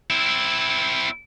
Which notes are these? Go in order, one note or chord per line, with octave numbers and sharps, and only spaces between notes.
C4 E4